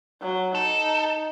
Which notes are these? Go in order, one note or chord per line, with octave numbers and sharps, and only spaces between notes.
F#3
D#4 A4